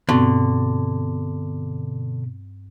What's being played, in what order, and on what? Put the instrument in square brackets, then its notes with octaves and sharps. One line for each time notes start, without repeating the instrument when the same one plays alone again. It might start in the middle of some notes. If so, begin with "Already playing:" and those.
[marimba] G2 C4 C#6 [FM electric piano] B2 [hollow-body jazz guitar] D3